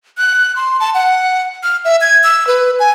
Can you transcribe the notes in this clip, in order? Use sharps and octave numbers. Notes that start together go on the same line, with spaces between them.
F#6
C6
A5
F#5
F6
E5
G#6
E6
B4
G#5